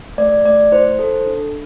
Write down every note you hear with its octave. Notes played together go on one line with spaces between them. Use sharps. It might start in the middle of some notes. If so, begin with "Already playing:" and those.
A3 D5
A3 D5
E4 C5
A4
D4